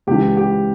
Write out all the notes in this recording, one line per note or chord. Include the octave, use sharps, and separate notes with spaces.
C#2 C#3 E3 G4
G4